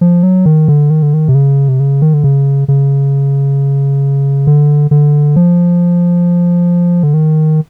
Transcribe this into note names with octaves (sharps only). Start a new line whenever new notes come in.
F3
F#3
D#3
D3
D#3
D3
D#3
C3
C#3
C3
C#3
D#3
D3
C#3
C#3
D3
D3
F3
D3
D#3